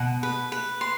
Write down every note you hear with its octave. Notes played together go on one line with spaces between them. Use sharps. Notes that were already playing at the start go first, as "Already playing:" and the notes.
Already playing: B2 F#5
B4
B4
C6